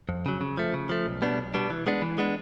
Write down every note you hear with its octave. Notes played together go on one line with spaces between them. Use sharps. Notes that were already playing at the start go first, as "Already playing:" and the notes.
F2
C#3 F#3
C#3
F3 A3
C#3
F3 A3
B1
B2 G3 B3 D4
B1
B2 G3 B3 D4
E3
G#3 B3 D4
E3
G#3 B3 D4